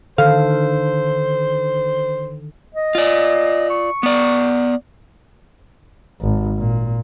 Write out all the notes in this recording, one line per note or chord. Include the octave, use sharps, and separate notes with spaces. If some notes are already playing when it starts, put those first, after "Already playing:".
D3 D#3 A4 C5 F5
D#5
F4 D5
C#6
B3 D5
G#1
A#2